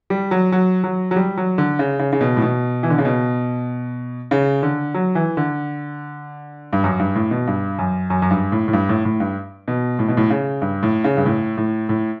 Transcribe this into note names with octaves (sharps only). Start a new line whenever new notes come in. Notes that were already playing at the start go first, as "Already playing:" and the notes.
G3
F#3
F#3
F#3
F#3
G3
F#3
D3
C#3
C#3
C#3
B2
A2
B2
E3
D3
C#3
B2
C#3
D3
F#3
E3
D3
G2
F#2
G2
A2
B2
G2
F#2
F#2
F#2
G2
A2
A2
G2
A2
A2
G2
B2
A2
B2
A2
C#3
G2
A2
C#3
G2
A2
A2
A2